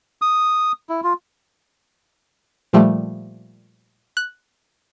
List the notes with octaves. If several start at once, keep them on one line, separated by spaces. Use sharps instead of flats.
D#6
E4
F4
A#2 F3 G3 A3
F#6